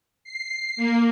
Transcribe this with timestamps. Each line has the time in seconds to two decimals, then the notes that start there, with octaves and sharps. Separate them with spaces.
0.24 C7
0.77 A#3